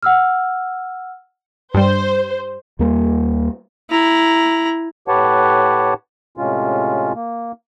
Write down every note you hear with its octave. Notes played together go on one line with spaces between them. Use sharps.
F#5 E6 F6
G2 G3 C5
D#2 G3 A#3
E4 A#5
A2 G4 B4 C#5 F#5 A5
A2 C3 G#3 C#4 F4
A#3